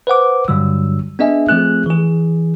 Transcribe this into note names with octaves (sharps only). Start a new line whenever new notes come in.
B4 C5 F#5 D6
G2 D3 F#3 G3 E6
B3 D4 G#4 D#5 E5 G#5
F3 A3 C4 G#4 F#6
E3 G#4